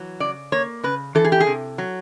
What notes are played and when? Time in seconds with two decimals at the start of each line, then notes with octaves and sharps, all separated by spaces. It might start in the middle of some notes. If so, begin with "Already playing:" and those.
Already playing: E3 F#3
0.20 C#3 D5
0.52 A#3 C#5
0.83 C#3 B4
1.15 E3 A4
1.25 G#4
1.32 G4
1.40 G#4
1.47 C3
1.78 F#3